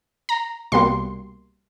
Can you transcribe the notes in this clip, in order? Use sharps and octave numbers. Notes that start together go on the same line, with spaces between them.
A#5
C2 B2 G3 A#3 C6